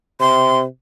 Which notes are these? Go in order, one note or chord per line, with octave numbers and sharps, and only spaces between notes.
C3 C6